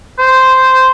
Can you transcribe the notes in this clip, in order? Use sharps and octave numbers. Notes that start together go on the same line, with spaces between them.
C5